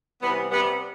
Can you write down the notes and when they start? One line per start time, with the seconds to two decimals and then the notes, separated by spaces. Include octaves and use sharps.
0.22 C3 E3 G3 B3
0.51 C3 G3 B3